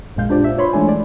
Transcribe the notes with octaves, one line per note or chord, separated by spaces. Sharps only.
A#1 F#2 A#2 G#3 F5 G6
D4 F4 G4 C5 D5
E5
F4 B4 C#5 B5 C6
E3 G#3 A3 D4 A4 G#5
D5